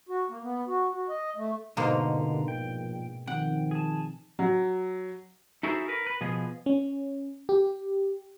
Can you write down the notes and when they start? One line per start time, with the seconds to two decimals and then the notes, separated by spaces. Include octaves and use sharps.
0.09 F#4
0.30 A#3
0.43 B3
0.67 F#4
0.92 F#4
1.09 D#5
1.36 A3
1.77 G#2 B2 D3 A#3 A#5 C6
2.13 C2
2.48 A#1 G5
3.27 D#3 F3 C4 F#5 G5
3.71 G#4 A5
4.39 F#3
5.63 D#4 E4 F#4 G#4 A4 C5
5.88 A#4 B4
6.07 B4
6.21 B2 F3 B3 G#4
6.66 C#4
7.49 G4